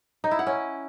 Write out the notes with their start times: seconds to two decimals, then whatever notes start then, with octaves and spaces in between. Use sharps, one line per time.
0.24 D#4
0.31 E4
0.39 F#5
0.47 C#4